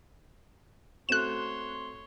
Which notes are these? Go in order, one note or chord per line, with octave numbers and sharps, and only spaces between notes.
A3 C4 F#4 C#5 C6 F#6 E7